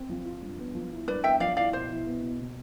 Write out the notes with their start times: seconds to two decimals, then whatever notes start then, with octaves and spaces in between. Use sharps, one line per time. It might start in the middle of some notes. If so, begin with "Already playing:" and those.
Already playing: C4
0.10 F3
0.25 F4
0.42 G2
0.59 B3
0.75 F3
0.91 E4
1.08 G2 B4 D5
1.24 B3 E5 G5
1.40 F3 D5 F5
1.57 E4 D5 F5
1.73 B2 C5
1.90 E4
2.07 B3
2.23 B2
2.40 B2